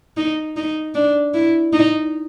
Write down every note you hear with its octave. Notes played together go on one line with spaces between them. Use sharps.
D#4
D#4
D4
E4
D#4